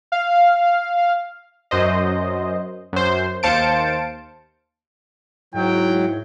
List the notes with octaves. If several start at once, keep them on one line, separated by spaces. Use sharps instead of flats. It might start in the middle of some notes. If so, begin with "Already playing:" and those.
F5
F#2 C5 D#5
F#2 C5
D#2 C5 F5 A5 C#7 D7
G#2 F#3 E4 G5